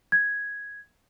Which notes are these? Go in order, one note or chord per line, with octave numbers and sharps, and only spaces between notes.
G#6